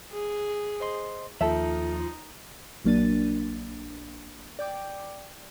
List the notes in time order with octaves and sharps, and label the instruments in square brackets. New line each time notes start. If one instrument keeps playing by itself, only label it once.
[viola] G#4
[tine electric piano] C5 D#5 C6
[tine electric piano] D#2 [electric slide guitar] F3 [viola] D#4 [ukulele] A4 E5
[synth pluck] A#1 F#3 A#3 D4 A6 D#7
D5 G5 D6